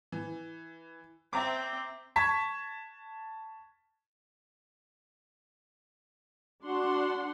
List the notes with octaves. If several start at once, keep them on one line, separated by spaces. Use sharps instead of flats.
E3
C4 E5 A#5 D6
A5 C#6 G#6 B6
D4 F#4 F#5 C6